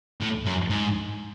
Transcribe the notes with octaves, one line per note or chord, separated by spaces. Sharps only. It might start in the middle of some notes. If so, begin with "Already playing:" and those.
A2
F#2
G#2